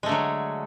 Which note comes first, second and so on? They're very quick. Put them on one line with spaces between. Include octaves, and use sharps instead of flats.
G#3 A3 D3 F#3